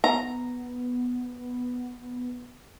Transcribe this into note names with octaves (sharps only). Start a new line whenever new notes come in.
B3 A#5